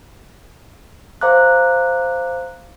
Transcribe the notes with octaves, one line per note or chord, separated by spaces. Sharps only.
C5 F5 A#5 D6 F#6